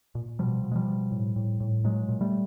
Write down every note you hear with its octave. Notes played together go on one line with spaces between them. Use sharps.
A#2
B2 F3 G3
B2
G#3
F3 G3
B2
A2
A2
A2
A#2 F#3 G#3
A#2
G3 A3